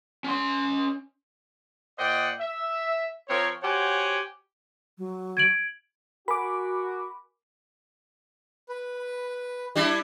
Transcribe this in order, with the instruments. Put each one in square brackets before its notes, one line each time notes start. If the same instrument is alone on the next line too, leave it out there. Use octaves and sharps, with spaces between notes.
[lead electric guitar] C#4 C6
[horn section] A#2 C5 D5 D#5 F#5 G5
E5
F3 C4 A#4 C#5
F#4 G4 C5 C#5 F#5 G#5
[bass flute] F#3
[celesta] G#6 D7 F#7
[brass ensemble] F#4 [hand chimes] A#4 G#5 [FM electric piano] B5 D6
[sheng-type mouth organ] B4
[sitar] G3 D4 E4